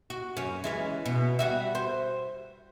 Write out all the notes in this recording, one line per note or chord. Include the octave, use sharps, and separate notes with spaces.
F#4
F#2 C#4
E3 G#3 C#4
B2
G3 F#4 E5
C5